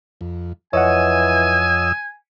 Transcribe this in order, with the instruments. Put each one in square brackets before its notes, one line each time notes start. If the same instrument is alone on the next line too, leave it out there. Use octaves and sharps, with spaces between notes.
[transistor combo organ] F2
[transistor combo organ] F2 D#6 E6 [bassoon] E3 [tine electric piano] C#5 D#5 F#5 [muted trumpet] G#5